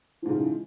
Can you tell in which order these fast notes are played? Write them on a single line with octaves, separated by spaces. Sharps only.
F3 G#2 C#3 E3 G#3